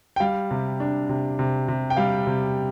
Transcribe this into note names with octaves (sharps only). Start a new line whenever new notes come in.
G5
G3 F5
C3
D4
C3
C3
C3
G5
G3 F5
C3